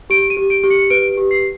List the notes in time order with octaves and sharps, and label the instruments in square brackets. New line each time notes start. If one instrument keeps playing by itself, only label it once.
[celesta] G4 D7
D#7
G4
D7
G4
C#7
B4 D7
G4
C7